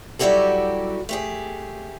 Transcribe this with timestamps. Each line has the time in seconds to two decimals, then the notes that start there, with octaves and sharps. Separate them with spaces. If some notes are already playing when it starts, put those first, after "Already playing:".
0.19 F#3 G3 E4 F#4 G4 A4
1.09 A3 G4 G#4